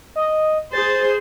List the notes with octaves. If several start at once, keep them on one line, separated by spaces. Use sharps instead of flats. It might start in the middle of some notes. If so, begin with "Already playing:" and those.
D#5
G#4 C5 A6